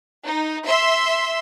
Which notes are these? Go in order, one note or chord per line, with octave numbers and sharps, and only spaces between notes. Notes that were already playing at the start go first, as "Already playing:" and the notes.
D#4
E5 C6 E6